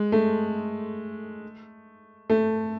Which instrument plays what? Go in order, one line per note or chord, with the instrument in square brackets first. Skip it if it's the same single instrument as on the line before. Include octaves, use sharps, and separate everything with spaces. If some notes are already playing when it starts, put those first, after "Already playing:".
Already playing: [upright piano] G#3
A3
A3